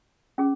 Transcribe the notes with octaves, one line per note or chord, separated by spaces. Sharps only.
C#4 G#4